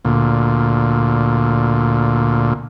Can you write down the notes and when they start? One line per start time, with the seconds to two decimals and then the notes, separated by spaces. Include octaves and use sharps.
0.05 D2 A#2